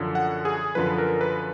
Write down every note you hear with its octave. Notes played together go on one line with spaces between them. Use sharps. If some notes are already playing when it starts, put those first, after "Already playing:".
Already playing: F#2 D3 F3
F#5
G#4
F#2 D3 F3 B4
A#4
B4